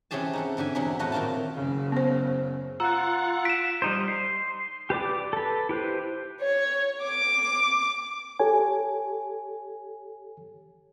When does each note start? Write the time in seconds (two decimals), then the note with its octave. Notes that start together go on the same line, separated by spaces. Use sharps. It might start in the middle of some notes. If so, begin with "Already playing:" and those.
0.11 C3 E3 C#4 G4 G#4 A5
0.33 D#4 A4 F#5
0.57 G#2 D3 G4 G#5
0.75 E2 C3 F#3 G4 G#4 B5
0.99 A2 A3 F4 F#4 D#5 F#5
1.12 A#2 D#3 D#4 F4 A5
1.54 F#1 C#3
1.92 B3 C5
2.80 F4 F#5 A#5 E6 F#6
3.45 B6 D7 E7
3.82 G3 D#4 C5
4.08 C6
4.90 G4 B4 D5 D6
5.33 A4 B4
5.69 E4 G4 B4 C5
6.42 C#5
7.03 D6
8.40 G4 A4 C#5 G#5